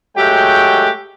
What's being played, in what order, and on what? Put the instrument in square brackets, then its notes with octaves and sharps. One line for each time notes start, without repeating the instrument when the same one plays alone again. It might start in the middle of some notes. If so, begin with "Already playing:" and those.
[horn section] F#3 G#3 A3 G4 F#5 G5